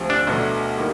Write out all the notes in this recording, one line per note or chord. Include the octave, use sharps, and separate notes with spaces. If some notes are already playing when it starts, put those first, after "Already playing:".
Already playing: D2 C3 F3
D4
B1 B2 F#3 A3
D#3 G3 A#3